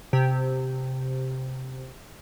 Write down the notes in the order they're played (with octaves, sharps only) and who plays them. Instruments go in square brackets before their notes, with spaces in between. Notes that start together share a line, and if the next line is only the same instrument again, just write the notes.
[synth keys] C3 G4